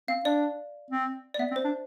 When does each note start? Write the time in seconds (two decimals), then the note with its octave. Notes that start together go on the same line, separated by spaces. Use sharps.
0.08 C4 F5
0.25 D4 D5
0.90 C4
1.34 D5
1.39 B3 E5
1.51 C4
1.56 C5
1.64 D4